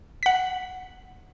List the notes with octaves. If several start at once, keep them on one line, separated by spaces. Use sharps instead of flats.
F#5 B6